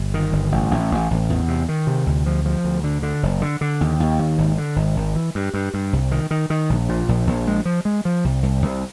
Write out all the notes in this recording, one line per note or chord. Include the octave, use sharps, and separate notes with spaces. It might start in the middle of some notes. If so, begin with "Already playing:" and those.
Already playing: G1
D#3
G1
A1
A1
A1
A1
E2
C3
D#3
C3
D2
F3
F3
D2
D3
D3
F#1
D3
D3
D#2
D#2
D#2
G#1
D3
G#1
G#1
E3
G2
G2
G2
C2
D#3
D#3
D#3
A#1
A#2
A#1
A#1
G#3
F3
G#3
F3
C2
C2
C2